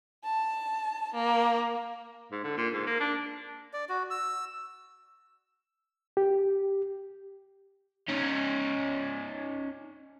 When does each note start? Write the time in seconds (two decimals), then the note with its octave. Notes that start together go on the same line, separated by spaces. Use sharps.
0.23 A5
1.14 A#3
2.31 G#2
2.44 D3
2.57 A#2
2.73 G#2
2.87 A#3
3.00 D4
3.73 D5
3.89 F#4
4.11 E6
6.17 G4
8.09 C#4 D#4